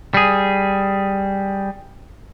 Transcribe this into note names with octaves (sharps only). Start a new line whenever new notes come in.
G3 G#4